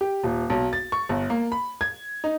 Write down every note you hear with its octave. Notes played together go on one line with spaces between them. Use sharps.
G4
D#1
B1
A6
C#6
G1
A#3
B5
G#6
D#4